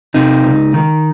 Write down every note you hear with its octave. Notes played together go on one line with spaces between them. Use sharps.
C3 D#4
C#2
D#3